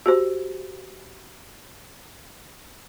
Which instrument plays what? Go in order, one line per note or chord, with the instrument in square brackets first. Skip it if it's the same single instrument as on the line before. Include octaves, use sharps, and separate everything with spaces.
[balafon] F#4 G4 C5